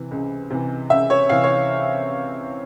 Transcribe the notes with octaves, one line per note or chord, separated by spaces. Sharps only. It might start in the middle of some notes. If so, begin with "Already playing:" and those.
Already playing: C3 E3
C#2
C3 E3
C#2 E5
C#5
C3 E3 F5
C#5